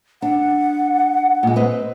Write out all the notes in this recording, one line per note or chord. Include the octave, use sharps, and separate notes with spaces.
D4 F#5
A#2 G#3
C4 B4 D#5